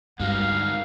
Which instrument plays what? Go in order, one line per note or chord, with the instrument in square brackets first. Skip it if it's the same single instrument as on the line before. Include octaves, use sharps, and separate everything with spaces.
[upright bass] G2 D3 [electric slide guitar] G#3 D#4 F#4 [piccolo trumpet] F5